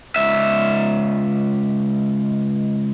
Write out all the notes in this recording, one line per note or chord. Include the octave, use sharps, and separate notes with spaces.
C#2 E5